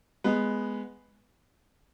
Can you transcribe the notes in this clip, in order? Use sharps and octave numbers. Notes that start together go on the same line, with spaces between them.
G#3 B3